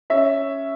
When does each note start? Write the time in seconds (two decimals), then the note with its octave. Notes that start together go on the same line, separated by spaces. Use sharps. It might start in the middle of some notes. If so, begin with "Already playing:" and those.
0.10 C#4 E5